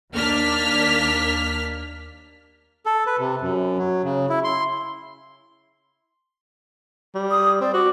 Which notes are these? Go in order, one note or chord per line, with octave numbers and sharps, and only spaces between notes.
D#2 A#3 D4 F6 B6
A4
B4
C3
F#2
F#3
C#3
E4
C6
G3
D#6
C4 D5
F#4 D6